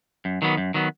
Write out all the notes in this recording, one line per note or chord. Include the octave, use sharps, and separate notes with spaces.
F#2
D#3 F#3 B3
F#2
D#3 F#3 B3